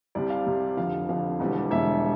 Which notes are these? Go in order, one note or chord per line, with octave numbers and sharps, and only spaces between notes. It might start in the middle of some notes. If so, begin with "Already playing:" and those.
C2 C3 G3 D5
F5
C2 C3 G3
F1 F2 D3 F5
F1 F2 D3 F5
E1 E2 D3 G3
E1 E2 D3 G3 E5